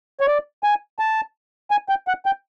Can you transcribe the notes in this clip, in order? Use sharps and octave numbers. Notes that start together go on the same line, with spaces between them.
C#5
D5
G#5
A5
G#5
G5
F#5
G5